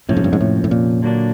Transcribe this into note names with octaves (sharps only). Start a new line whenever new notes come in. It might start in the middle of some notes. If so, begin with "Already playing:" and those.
F2 A2 C3 F3 A#3 C#4
G#2
G2
G#2
A2
A2
A#2
D3 F#3 A#3 D4